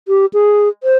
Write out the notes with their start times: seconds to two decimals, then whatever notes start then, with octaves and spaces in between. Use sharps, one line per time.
0.08 G4
0.33 G#4
0.84 C5